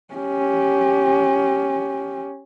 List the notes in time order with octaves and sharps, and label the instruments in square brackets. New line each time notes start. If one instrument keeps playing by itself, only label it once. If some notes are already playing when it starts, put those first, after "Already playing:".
[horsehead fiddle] C#4 G4